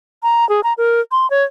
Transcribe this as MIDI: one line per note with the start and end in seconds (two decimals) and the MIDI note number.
0.23 0.47 82
0.49 0.61 68
0.64 0.73 82
0.78 1.01 70
1.12 1.29 84
1.30 1.44 73